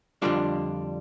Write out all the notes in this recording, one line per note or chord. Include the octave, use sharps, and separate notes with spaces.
F2 D3 G3 D4 F4